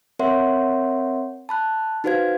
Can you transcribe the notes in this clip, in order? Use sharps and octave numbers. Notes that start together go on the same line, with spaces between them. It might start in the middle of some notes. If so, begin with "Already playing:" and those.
C4 A#4 C#5 E5 F#5 C6
A5 B5 F#6
D#4 F#4 B4 C5 F5 G#6